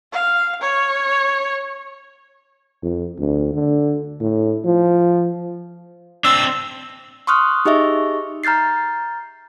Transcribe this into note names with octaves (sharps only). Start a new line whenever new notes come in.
F5
C#5
F2
D2
D3
A2
F3
C4 D4 E6
C6 C#6 D#6 F6 F#6
D#4 G4 G#4 D#5 E5 C#6
A#5 F6 G6 A6 C7